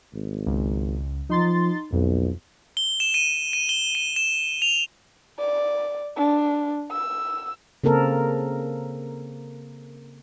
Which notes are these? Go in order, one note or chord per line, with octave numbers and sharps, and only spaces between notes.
G#1
C#2
F3 D#4 C6 A6
B1 F2
G7
E7
D#7
D#7
G7
D#7
E7
F7
D5
D4
E6
C#3 A#3 C4 A4 A#4